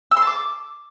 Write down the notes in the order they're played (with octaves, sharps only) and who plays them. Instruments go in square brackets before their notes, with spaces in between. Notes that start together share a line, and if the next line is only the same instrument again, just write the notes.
[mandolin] E6
C6
A5
D6